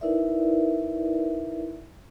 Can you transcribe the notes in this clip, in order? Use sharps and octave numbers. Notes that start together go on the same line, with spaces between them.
D#4 E4 A#4 B4 D5 E5